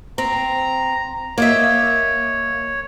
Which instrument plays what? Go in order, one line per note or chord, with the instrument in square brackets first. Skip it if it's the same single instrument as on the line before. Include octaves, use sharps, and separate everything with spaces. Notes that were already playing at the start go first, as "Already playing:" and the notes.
[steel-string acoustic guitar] C4 [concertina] A#5
[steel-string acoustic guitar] A#3 D#5 E5 [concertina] C#5